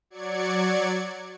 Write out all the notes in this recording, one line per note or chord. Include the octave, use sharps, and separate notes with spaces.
F#3 D5 G#6 C#7